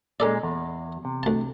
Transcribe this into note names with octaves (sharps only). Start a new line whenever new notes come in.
A#2 G#3 C#4 A4 D5
E2
C3
D2 A5